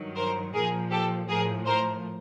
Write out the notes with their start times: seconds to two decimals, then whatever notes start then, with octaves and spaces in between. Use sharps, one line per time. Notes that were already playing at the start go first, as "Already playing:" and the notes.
Already playing: G2 D#3 F#3
0.16 A#4 C5
0.54 A#2 F3 G#4 A#4
0.91 G4 A4
1.29 A2 F3 G#4 A#4
1.66 A#4 C5